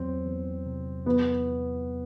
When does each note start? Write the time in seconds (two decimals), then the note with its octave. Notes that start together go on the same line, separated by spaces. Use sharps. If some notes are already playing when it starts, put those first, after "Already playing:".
Already playing: E2 F#3 C4
0.26 E2
0.66 C3
1.06 E2 B3